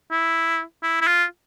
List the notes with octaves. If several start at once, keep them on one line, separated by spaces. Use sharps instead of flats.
E4
E4
E4
F4